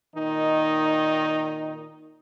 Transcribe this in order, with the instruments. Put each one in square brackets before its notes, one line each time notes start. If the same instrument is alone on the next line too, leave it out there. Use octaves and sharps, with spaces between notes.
[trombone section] A#2 D#3 D#4